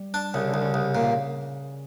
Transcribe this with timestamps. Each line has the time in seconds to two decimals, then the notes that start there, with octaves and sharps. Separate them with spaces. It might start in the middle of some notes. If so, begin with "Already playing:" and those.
Already playing: G3
0.14 D4
0.34 C2 C#3
0.47 D3
0.54 C2
0.61 C#3
0.74 C2
0.95 A#2